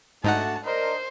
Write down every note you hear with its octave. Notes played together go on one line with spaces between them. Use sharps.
G#2 A3 D4 D#4 F#4 F#5 A5
D4 A#4 C5 D#5